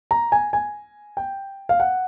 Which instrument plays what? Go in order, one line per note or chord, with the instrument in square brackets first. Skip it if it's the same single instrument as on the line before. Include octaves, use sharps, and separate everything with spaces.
[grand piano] A#5
G#5
G#5
G5
F5
F#5